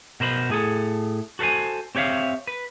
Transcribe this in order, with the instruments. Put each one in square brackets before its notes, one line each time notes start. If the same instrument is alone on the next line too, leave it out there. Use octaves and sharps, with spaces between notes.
[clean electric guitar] B2 A#4 C5 B5
A2 G#4 A4
F#4 A4 B4 C5 G#5
C4 G4 C#5 E5 F5
B4